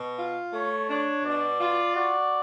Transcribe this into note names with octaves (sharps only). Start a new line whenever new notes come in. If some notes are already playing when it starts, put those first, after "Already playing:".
Already playing: B2
F4
A3 C#5
D4 C#5
B2 D5
F4
F#4 D5